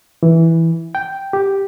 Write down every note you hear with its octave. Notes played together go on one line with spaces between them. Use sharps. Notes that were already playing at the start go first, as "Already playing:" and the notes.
E3
G5
G4